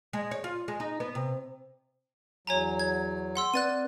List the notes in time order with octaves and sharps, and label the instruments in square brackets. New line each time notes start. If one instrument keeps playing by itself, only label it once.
[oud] G#3
C#5
F4
G#3
D#4
B3
C3
[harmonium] E2 F#3 [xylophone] C#5 G#5 A#5
[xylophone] G#6
F#5 C6 E6
[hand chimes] C4 B4 D5 [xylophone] F#6 A6 D#7